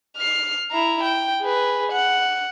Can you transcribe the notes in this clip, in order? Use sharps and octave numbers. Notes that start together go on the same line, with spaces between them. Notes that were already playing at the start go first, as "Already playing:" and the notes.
F6 C7
E4 A#5
G5
G#4 B4
F#5